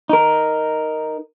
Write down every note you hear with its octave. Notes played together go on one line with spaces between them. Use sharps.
D#4 A#4